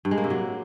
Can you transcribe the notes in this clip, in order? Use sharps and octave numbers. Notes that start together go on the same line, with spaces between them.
G2
G#3
A#3
C3
F#3